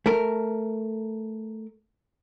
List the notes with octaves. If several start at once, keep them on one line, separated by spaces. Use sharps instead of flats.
A3 A#4